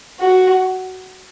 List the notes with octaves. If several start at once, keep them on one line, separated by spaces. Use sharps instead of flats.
F#4